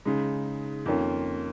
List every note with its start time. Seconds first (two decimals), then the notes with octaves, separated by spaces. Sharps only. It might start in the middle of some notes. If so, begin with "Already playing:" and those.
0.05 C#3 G#3 D#4
0.86 F2 D#3 A#3 C#4 F4